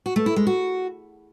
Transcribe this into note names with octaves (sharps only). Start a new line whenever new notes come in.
F#4
A3
E4
G#3
F#4